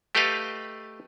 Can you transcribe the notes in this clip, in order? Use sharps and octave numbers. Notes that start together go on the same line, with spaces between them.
A3 G4 A4 B4 D#5 F5